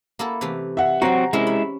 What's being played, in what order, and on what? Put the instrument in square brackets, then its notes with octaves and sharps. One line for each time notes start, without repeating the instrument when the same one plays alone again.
[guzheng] A#3 E4 A4
C3 E3 A3
[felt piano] E5 F#5
[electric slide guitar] F#3 C4 F#4 [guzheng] F#5 G5 [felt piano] A#5
[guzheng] C3 C#4 A#4 [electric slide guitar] G#3 E4
[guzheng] B5